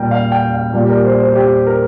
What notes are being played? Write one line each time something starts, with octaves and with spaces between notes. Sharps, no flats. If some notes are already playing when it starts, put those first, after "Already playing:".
Already playing: A#2 G3 G5 A#5
F5
G5
F5
A#2 G3
G4
A#4
C5
C5
G4
A#4